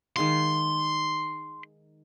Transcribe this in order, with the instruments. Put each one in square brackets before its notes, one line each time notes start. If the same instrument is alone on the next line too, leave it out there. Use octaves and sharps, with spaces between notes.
[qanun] D#3 G#3 F5 [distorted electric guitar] C6